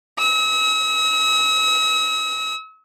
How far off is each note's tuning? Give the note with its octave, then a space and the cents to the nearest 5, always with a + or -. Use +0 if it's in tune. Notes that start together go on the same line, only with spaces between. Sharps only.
E6 -45